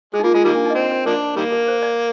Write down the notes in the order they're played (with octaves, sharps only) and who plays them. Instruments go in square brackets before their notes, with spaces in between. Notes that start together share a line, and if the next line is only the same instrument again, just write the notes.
[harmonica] G#3 [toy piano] G#4
[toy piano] D#4
[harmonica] A#3 [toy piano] F4
[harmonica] G#3 [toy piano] F4
[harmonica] D#3 G3 A#3 [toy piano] D#4
[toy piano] D4
D#4
D#5
[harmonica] C4 [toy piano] D5
[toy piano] A#4
[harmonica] F3 A#3 D4 [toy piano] A#4
[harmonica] D#3 G3 A#3
[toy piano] A#4
C5
D5